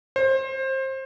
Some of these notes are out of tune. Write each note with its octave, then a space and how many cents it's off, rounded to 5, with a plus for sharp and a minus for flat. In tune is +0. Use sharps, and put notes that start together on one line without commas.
C5 +25